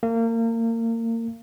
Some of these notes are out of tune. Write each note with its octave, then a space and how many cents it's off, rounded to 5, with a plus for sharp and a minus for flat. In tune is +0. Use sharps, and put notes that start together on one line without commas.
A#3 -30